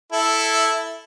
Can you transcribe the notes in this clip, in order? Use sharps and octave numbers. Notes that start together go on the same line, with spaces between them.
E4 A4